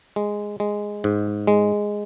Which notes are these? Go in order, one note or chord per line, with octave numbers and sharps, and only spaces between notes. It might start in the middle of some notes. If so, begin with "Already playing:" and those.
G#3
G#3
G#2
G#3